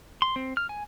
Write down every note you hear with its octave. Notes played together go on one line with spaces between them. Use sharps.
C6
C4
F6
G#5